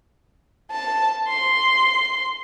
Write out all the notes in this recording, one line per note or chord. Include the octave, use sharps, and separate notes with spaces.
A5
C6